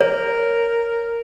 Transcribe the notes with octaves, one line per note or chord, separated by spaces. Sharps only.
A#4 C#5